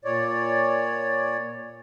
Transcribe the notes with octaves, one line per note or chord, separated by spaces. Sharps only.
A#2 C#5 D5